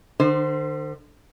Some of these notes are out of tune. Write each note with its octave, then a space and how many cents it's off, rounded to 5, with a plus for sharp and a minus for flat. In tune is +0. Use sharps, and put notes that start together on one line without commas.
D3 +45 C5 -5